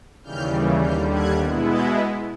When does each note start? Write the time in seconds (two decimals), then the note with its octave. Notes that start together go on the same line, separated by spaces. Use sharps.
0.24 D#2 C#3 E3 G3 F6 G6
0.82 D#2 D3 G3 F6 G6
1.12 F#6 G#6
1.41 B2 G#3 B3 E4
1.70 G6 A6